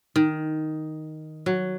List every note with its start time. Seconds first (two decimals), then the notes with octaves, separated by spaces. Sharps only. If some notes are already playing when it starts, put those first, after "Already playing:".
0.16 D#3
1.46 F#3